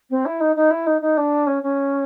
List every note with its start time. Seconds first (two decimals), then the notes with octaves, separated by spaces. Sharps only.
0.10 C4
0.25 E4
0.40 D#4
0.55 D#4
0.70 E4
0.86 D#4
1.01 D#4
1.17 D4
1.46 C#4
1.62 C#4